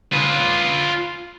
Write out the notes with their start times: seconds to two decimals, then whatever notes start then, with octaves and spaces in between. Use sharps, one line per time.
0.13 F4 B4